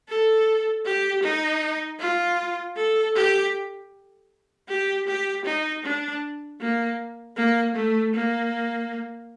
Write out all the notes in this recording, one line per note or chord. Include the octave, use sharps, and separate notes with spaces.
A4
G4
D#4
F4
A4
G4
G4
G4
D#4
D4
A#3
A#3
A3
A#3